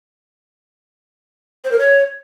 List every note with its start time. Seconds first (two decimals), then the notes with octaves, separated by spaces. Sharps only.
1.64 C5
1.72 A#4
1.79 C#5